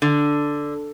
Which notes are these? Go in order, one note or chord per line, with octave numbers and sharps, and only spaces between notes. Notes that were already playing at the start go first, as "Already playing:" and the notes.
D3